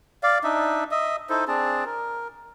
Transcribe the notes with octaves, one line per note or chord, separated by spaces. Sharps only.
D5 F5
D4 D#4 E5
D#5 E5
D#4 E4 A4 C5
C4 D4 G#4 A5
A#4